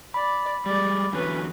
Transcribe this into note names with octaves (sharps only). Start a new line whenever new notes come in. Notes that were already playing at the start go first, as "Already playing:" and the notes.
D5 B5
G3 G#3 D5
E2 D3 F#3 C#4 B4